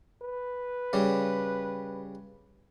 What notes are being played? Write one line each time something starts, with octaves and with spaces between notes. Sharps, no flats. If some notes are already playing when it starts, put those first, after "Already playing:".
B4
C#3 G3